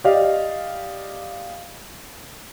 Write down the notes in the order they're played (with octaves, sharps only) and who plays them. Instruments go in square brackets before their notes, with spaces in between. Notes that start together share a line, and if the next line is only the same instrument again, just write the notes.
[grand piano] G4 D5 D#5 F5